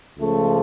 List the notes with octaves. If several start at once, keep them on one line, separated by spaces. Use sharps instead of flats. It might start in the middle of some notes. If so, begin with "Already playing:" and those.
C#2 C#3 F3 A3